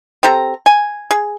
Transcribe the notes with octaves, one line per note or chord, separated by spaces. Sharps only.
C4 G4 A4 A#5
G#5
G#4